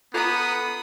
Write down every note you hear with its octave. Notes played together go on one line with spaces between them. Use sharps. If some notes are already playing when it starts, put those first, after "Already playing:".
B3 F4 A4 A#5 B5 D#6